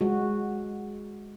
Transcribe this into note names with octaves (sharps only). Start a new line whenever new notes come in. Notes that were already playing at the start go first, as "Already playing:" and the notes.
G#3 F#4